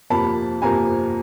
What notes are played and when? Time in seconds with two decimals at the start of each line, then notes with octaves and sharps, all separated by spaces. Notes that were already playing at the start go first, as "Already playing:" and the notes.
0.10 F2 C3 F3 A#3 A5 B5
0.62 F2 C3 F3 A#3 G#5 A#5